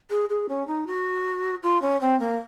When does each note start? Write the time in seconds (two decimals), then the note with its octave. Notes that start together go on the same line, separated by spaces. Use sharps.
0.10 G#4
0.29 G#4
0.49 C#4
0.67 D#4
0.87 F#4
1.63 F4
1.82 C#4
2.01 C4
2.19 A#3